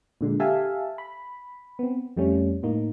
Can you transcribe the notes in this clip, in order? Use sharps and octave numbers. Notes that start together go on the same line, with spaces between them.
A#2 D3 G#3
G4 A4 E5 F5 G#5 A5
B5
B3 C4
F2 G3 A3 C#4
A2 A#3 D#4